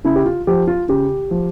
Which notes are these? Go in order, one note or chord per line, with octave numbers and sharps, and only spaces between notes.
C#3 E4
G4
F4
F3 G4
F4
C#3 G4
F3